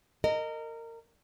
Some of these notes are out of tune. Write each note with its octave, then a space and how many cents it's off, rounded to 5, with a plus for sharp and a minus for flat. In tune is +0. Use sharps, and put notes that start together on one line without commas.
A#4 -25 D#5 -10